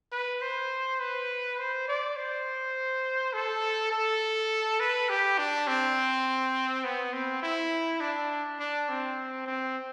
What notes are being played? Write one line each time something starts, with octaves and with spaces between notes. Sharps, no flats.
B4
C5
B4
C5
D5
C5
A4
A4
B4
G4
D4
C4
B3
C4
E4
D4
D4
C4
C4